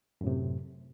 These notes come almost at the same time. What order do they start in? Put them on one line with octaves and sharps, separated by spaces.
F#2 A2 C3